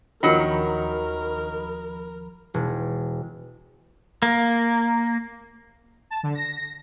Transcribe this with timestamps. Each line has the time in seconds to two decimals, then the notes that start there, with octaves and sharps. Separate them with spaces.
0.23 D#2 D#3 F3 F#3 A#4 B5
2.54 E1
4.22 A#3
6.10 A5
6.23 D3
6.35 A#6